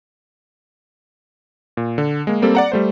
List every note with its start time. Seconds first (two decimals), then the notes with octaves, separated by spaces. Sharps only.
1.77 A#2
1.98 D3
2.27 G#3 A#3
2.42 G3 A#3 C4 G4 A4
2.55 D5 F#5 A#5
2.72 G3 A3 C5